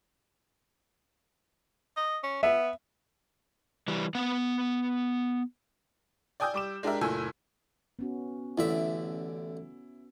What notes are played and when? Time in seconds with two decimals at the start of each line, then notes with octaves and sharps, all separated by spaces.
1.97 D#5
2.23 C#4
2.43 B3 E5
3.88 E3 G3
4.15 B3 F#5
6.40 D5 G5 G#5 D#6 E6 G6
6.54 G3 D6 E7
6.83 G#3 D4 G4 A#4 E5
7.01 F#1 A#2 A3 G#5 E6
7.99 B3 C#4 F#4
8.58 A1 D3 E4 E5